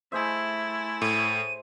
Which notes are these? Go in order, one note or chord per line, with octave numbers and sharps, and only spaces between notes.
A3 E4 G#4 C5 E5
A2 D#7